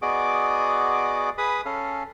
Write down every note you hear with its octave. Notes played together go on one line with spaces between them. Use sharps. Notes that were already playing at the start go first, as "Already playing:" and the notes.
B3 F#4 G#4 D5 D#5 D6
G#4 B4 B5 D#6
C#4 A4 F5